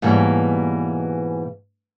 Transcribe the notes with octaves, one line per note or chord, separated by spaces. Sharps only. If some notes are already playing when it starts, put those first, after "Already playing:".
G#2 B2 E3 G3 A#3 C#5